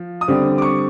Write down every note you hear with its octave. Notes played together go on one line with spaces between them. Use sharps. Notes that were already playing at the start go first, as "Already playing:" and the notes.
Already playing: F3
D#6
D3 G3 C4
D6
C#6